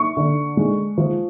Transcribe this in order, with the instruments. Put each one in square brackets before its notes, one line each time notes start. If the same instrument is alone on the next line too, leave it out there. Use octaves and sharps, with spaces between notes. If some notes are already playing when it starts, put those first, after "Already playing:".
Already playing: [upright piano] C#6
D3
G#3
F3